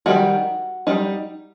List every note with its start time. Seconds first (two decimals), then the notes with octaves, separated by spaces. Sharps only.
0.06 D#3 G3 D#4 F#4
0.87 G3 D#4